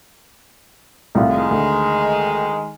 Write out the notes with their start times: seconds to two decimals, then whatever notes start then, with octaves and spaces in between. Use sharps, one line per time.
1.15 C2 A2 F4
1.28 D#3 G#3
1.51 D2